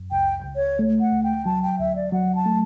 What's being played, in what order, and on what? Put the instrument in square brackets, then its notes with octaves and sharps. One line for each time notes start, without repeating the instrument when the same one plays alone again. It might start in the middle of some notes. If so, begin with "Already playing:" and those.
Already playing: [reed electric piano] F#2
[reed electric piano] C#2 [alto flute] G5
[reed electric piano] C#2
[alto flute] C#5
[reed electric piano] A3
[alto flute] F#5
[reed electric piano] C#2
[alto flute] G5
[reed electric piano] F#3 [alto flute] A5
[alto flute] G5
[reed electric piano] D2 [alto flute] E5
[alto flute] D5
[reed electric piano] F#3 [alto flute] F#5
[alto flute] A5
[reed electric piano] A3